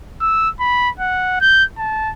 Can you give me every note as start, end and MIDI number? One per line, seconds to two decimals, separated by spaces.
0.21 0.50 88
0.60 0.90 83
1.00 1.39 78
1.41 1.64 91
1.78 2.11 81